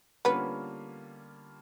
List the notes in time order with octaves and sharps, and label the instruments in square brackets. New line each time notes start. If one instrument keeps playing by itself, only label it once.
[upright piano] D3 G3 A#3 C#4 F4 [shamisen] B3 B4